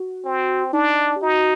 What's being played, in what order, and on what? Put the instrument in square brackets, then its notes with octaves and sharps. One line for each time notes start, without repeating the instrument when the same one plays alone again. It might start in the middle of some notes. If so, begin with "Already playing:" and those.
Already playing: [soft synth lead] F#4
[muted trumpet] C4
[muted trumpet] D4 [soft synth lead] D#4
[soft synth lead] G4
[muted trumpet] D#4 [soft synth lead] F#4